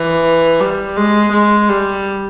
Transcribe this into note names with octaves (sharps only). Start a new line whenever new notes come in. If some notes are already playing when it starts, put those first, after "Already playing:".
Already playing: E3
G3
G#3
G#3
G3